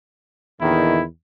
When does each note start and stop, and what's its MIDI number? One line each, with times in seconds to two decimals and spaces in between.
0.61 1.06 40
0.61 1.02 46
0.61 1.02 50
0.61 1.02 51
0.61 1.03 64